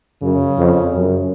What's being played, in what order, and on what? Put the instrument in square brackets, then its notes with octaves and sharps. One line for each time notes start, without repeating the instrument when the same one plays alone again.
[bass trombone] F#2 [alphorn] C#3
[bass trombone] F2
F#2